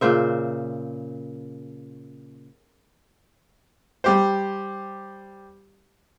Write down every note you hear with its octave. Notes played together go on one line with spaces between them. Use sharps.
A#2 C#3 C5 E5
G3 G4 C5